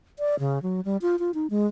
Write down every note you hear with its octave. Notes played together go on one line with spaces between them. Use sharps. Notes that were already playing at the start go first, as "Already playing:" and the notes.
D5
C#3
F#3
G3
F4
F4
D#4
G#3